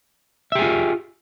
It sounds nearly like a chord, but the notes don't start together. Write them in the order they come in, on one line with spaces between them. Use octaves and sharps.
E5 G4 G#4 F4